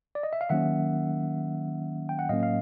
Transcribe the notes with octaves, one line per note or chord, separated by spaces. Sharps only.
D5
D#5
E5
F5
D#3 F#3 A#3 C#4 E5 F#5
G5
F#5
A2 F#3 A#3 C#4 D#5 F5
F5